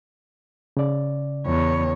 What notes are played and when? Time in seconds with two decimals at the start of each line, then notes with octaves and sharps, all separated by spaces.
0.77 C#3 D5
1.46 E2 C#5